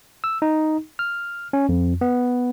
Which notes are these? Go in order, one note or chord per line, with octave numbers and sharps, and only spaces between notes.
E6
D#4
F6
C#4
F2
B3